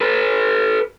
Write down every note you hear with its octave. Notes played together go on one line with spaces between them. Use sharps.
A4 B4